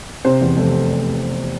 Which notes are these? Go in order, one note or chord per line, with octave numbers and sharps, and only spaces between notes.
C3 C5
E2
F1 A4